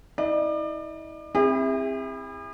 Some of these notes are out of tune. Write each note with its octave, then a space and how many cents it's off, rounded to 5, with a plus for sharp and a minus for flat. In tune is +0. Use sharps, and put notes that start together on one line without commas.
E4 -45 D5 +35
C4 +15 E4 -5 G#4 -45